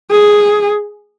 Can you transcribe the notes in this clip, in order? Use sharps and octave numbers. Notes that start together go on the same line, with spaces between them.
G#4